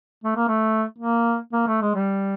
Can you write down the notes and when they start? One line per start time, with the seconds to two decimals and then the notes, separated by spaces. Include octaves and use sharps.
0.24 A3
0.36 A#3
0.48 A3
0.98 A#3
1.53 A#3
1.67 A3
1.81 G#3
1.95 G3